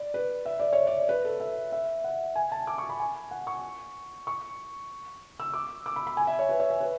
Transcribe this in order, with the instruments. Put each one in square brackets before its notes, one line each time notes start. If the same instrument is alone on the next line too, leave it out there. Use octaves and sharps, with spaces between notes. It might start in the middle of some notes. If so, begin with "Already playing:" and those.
Already playing: [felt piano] D5
B4
E5
D5
C#5
D5
B4
A4
E5
E5
F#5
G#5
A5
D6
C#6
B5
G#5
F#5
C#6
C#6
E6
D6
D6
B5
B5
G#5
E5
C#5
B4
C#5
E5
B4